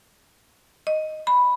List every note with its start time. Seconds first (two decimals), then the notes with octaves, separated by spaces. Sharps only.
0.87 D#5
1.27 B5